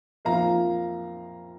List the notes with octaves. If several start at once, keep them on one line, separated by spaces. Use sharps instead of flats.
F2 F3 A#3 F5 A#5